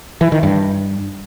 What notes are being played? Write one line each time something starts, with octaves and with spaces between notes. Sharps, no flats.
E3
D#3
G2